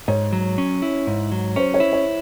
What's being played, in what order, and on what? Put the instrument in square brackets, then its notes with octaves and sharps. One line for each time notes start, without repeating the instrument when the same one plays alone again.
[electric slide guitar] G#2 [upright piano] C#5
[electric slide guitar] F#3
C#4
E4
G#2
F#3
[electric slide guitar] C#4 [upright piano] C5
[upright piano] C#5
[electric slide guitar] E4
[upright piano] C#5